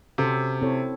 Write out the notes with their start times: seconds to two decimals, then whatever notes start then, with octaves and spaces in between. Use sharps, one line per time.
0.18 C3 C#4 F#4 A4 C5
0.61 C4 E4 A4 C#5